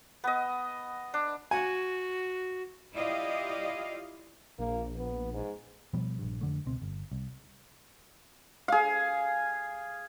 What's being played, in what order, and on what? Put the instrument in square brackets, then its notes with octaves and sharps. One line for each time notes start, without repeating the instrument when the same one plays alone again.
[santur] B3 D#5
D4
[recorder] F#4 [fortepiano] G#5
[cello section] E4 F4 G4 D5 D#5 F5
[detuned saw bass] A#1 [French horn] A#3
[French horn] B3
G#2
[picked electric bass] B2 F3 G3 B3
A#1 G2
F2 D3 A3
C#2 B2 C4
G1
C2
[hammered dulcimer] G#4 F5